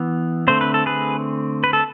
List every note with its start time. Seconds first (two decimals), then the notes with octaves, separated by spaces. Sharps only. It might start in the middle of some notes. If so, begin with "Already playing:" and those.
Already playing: E3 B3
0.48 D3 A3 C4 C5
0.61 B4
0.74 A4
0.86 G#4 B4
1.64 B4
1.73 A4